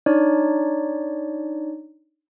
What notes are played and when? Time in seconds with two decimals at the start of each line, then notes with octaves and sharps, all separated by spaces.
0.06 D4 D#4 C#5 D5